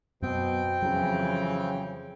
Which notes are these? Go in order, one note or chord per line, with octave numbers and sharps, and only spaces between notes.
F#2 B2 B3 C4 G5
F2 C#3 E3 F#3 C#4